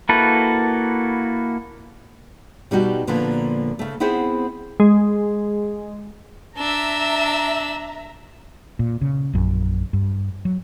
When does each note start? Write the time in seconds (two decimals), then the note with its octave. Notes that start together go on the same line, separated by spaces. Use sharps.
0.09 A#3 E4 F#4 A4 B4
2.71 B2 G3 D#4 F#4 G4
3.07 A#2 D3 F3 A#3 B3
3.79 C#3 A3
4.00 B3 C4 E4 G#4 C5 F#5
4.80 G#3
6.57 D4 E5 A#5 E6
8.79 A#2
9.01 C#3
9.33 A#1 F#2
9.93 G2
10.45 F#3